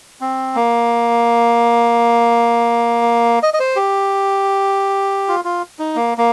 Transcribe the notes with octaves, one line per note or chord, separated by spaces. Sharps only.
C4
A#3
D#5
D#5
C5
G4
F4
F4
D#4
A#3
A#3